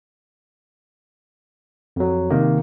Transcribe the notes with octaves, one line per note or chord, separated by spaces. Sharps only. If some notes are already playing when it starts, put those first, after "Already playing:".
F2 F#3
C3 D#3 A#3